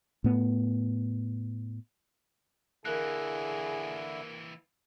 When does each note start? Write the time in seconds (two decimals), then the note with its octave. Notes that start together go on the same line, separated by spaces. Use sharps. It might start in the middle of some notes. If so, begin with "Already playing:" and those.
0.24 A2 B3
2.85 D3 E3 A#3 E4 G#4 A#4 F#6